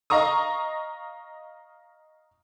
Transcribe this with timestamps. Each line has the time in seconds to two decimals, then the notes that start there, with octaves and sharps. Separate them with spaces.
0.10 D#5 F5 A#5 C#6 D#6